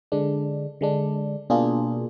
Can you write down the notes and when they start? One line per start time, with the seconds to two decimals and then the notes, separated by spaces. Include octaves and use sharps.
0.12 D3 G#3 D4
0.81 D3 G#3 D4
1.50 B2 A#3 D4 F4 G#4